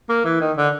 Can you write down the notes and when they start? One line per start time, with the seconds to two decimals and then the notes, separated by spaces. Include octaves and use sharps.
0.09 A#3
0.25 E3
0.41 D#3
0.57 D3